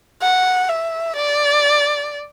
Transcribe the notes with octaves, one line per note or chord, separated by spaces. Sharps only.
F#5
E5
D5